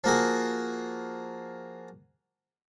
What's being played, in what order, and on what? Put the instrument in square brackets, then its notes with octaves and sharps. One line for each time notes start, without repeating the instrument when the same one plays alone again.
[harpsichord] F3 A#3 F#4 G#4